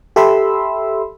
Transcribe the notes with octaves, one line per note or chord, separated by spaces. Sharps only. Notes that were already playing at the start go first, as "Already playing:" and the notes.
G4 A4 E5 B5 C6 E6